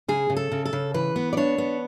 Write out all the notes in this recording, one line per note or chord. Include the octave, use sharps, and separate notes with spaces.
C#3 G#4
C#3
A4
C#3
A4
C#3
E3 B4
B3
D5
D4 C#5
B3